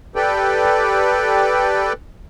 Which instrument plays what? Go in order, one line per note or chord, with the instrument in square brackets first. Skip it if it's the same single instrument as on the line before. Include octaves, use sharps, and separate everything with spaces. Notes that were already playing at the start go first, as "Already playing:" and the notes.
[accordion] G4 A4 B4 D5 G5